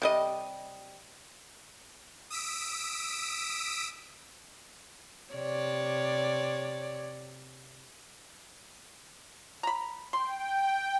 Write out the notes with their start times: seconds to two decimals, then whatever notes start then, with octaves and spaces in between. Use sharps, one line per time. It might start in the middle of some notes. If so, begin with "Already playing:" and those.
0.02 C3 G3 D#5
2.30 D#6 E6 B6 D7
5.33 C3 C#5 D5
9.63 A#5 B5
10.13 G5 C6